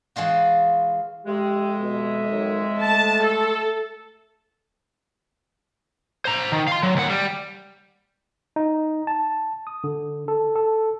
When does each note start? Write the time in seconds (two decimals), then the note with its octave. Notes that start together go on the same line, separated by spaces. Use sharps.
0.16 E3 G#3 F4 F#4
1.26 F2 G#3 G4 E5
1.79 B2
2.29 D#3 F#3
2.81 A3 A5
3.24 A4
6.25 C5 A#5
6.52 D#3
6.68 F5 C6
6.83 F#3
6.96 D#2 F#5
7.10 G3
8.56 D#4
9.07 A5
9.67 D#6
9.84 D3
10.28 A4
10.56 A4